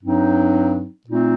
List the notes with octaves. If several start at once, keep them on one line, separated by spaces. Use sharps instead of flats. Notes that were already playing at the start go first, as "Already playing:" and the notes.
G2 F#3 C4 D#4
A#2 A3 C4 D#4